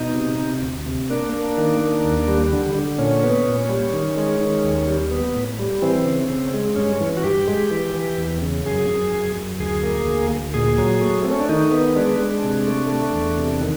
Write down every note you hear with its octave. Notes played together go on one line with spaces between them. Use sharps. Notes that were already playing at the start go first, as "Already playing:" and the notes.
Already playing: B2 D#4
C3
C3
D2
C3
A#3 D4
A#3
D#3
A#3
D#2
G3
D3
D3
A#2 C#4
B3
A#2
G3
D#3
G#3
D#3
D#2
G3
B3
A2
G3
E3 C4
C#3
C#3
G#3
G2 C#4
E3
F#4
G2 G4
G#3
E3
E3
E2
C#3
F#2 G#4
F#2
F#2
F#2
D2 G#4
A#3
D2
D2
A#2 G#4
F#3
A3
A3 C4
C#4
D4
D#3 D#4
B3
G#3 D4
G#3
C3
A3
A3
E2
C3
D#3